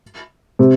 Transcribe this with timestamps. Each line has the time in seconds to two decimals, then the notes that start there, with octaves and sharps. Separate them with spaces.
0.59 C3